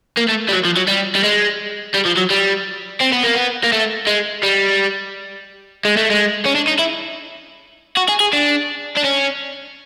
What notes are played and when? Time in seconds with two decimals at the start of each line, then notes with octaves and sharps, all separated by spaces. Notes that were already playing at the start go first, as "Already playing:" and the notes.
0.17 A#3
0.28 A3
0.48 G3
0.52 F#3
0.65 F3
0.77 F#3
0.88 G3
1.15 G3
1.24 G#3
1.95 G3
2.06 F3
2.18 F#3
2.30 G3
3.00 C4
3.12 B3
3.23 A#3
3.35 B3
3.64 A#3
3.72 A3
4.07 G#3
4.43 G3
5.85 G#3
5.97 A3
6.11 G#3
6.46 C#4
6.55 D4
6.67 D#4
6.79 E4
7.97 F#4
8.09 G#4
8.20 G#4
8.33 D4
8.97 D4
9.04 C#4